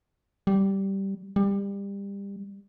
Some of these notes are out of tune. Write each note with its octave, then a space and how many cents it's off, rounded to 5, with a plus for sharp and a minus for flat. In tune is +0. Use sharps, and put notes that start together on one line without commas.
G3 -10
G3 +25